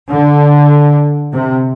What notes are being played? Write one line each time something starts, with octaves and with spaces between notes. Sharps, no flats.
D3
C3